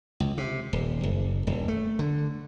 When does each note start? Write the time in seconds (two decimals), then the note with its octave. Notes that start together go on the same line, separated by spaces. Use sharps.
0.20 C#2
0.38 C3
0.73 D#1
1.03 F#1
1.47 D#1
1.68 A3
1.99 D3